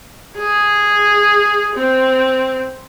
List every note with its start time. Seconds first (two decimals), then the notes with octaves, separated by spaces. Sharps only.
0.37 G#4
1.75 C4